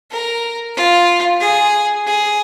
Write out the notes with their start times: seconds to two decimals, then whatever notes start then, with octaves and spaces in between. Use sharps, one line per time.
0.11 A#4
0.76 F4
1.40 G#4
2.06 G#4